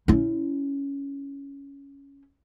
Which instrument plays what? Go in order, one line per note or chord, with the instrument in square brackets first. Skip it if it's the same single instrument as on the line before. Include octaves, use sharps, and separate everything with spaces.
[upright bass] C#4 E4